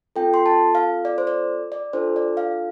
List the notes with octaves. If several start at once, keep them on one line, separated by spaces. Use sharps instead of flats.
C4 F4 A4 G5
C6
A5
F5
D5
C5
D5
D5
D4 F4 A4 C5
D5
F5